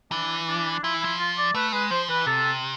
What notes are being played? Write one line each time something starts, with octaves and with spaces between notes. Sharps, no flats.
E3 D4
D4
D4
F3 E4
E3
F3 E4
F4
D5
A3 B4
G#3 B4
F3 C5
E3 B4
C3 A4